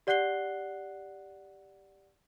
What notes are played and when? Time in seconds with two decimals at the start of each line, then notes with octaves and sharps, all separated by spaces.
0.07 G4 D5 F#5 F#6 C7 G7